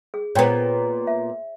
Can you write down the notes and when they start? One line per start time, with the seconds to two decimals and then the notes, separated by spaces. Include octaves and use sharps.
0.14 G#4
0.35 A#2 B3 C#5 G5 A#5
1.07 E5